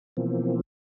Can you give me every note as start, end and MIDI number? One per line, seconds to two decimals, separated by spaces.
0.17 0.61 47
0.17 0.61 52
0.17 0.61 53
0.17 0.61 58
0.17 0.61 60